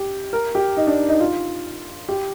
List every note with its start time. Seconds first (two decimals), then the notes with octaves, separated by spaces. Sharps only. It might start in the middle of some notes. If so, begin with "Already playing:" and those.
Already playing: G4
0.33 A#4
0.55 G4
0.77 D#4
0.87 D4
1.09 D#4
1.20 F4
2.09 G4